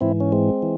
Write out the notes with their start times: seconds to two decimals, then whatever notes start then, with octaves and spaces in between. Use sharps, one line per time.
0.01 G#2 E3 C4 E4
0.20 C#4
0.32 G#3 C4
0.62 E3